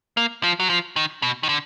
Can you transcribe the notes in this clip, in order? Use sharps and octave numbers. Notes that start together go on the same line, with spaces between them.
A#3
F3
F#3
F3
D#3
B2
D#3
D3